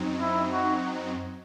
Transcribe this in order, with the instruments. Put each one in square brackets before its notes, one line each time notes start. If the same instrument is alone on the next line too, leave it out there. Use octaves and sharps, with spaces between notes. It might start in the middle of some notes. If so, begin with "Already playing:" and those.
Already playing: [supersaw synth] F#2 F#3 C4 D#4
[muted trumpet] E4
F#4